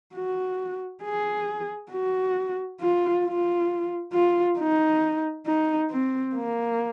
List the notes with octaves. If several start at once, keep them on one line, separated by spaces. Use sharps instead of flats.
F#4
G#4
F#4
F4
F4
F4
D#4
D#4
C4
A#3